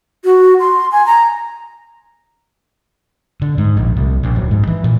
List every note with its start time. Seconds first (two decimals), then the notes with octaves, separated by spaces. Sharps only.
0.25 F#4
0.60 C6
0.92 G#5
1.06 A#5
3.42 D3
3.58 G#2
3.77 A#1
3.96 C2
4.23 A#1
4.35 D1
4.51 G#2
4.67 E3
4.84 A#2